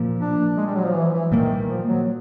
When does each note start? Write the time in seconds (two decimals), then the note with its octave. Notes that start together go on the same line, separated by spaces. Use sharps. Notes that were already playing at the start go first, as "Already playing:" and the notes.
Already playing: A#2 F3 A#3
0.20 D4
0.57 G#3
0.66 G3
0.76 F#3
0.85 F3
0.94 E3
1.13 E3
1.31 A#2 D#3 G3 A#3
1.68 F3
1.87 F#3